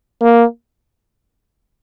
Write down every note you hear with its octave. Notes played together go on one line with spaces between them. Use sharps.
A#3